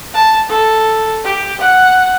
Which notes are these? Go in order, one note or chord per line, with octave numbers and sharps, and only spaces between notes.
A5
A4
G4
F#5